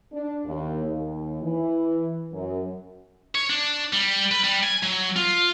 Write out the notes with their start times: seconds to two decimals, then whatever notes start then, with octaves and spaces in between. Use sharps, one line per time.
0.12 D4
0.46 D#2
0.85 D#2
1.42 E3
2.32 F#2
3.35 C#5
3.50 D4
3.93 G3
4.32 B4
4.44 G3
4.64 G#5
4.83 F#3
5.16 F4